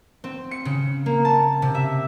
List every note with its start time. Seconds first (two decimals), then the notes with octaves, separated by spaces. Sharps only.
0.24 C4
0.51 C#7
0.65 C#3
1.06 A#3
1.25 A5
1.62 C3
1.75 E5